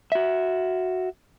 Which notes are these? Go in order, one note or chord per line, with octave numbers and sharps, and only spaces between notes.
F#4 E5